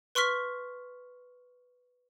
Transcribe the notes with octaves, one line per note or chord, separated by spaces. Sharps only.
B4 C6 C#6 F6 B6